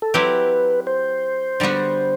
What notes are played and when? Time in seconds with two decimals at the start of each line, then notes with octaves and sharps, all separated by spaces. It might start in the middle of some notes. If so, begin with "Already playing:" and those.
0.02 A4
0.14 F#3 C4 E4 G4 B4
0.87 C5
1.60 D3 G3 B3 F#4